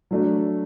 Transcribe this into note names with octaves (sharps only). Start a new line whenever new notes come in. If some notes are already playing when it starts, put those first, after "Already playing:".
F#3 A3 D4